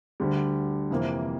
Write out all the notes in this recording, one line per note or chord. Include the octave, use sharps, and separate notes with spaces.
D2 D3 G3
F2 C3 E3 A#3